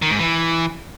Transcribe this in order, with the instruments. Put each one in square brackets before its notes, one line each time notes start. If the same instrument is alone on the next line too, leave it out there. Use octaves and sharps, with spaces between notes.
[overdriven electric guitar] D#3
G#2
E3